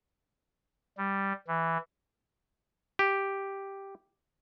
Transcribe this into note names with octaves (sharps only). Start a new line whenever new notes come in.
G3
E3
G4